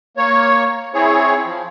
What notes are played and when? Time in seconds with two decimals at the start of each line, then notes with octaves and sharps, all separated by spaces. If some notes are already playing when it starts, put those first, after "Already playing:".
0.17 A#3 C#5
0.94 C4 E4 G#4 C#5
1.46 F3